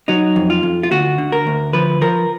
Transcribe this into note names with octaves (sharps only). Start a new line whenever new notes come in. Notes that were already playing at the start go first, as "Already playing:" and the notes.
F#3 D#4
F2
F4
F2
F4
D2 F#4
D3
A#4
D2
F3 B4
F3 A#4